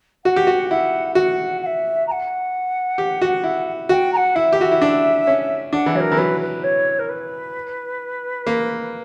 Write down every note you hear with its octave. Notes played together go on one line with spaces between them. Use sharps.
F#4 F#5
G4
F#4
E4 F#5
F#4 F#5
F#5
E5
A#5
F#5
G4
F#4
E4
F#4 G5
A#5
F#5
E4 E5
G4
F#4 E5
E4
D4
C#4
D4 F#5
E3
F#3 A#4 C#5
E3
F#3 B4
B4
C#5
A#4
B4
A#3